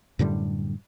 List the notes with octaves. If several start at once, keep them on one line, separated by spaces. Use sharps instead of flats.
F#2 A2 D3 G3